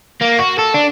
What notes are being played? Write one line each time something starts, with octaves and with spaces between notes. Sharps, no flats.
A#3
F#4
A4
D4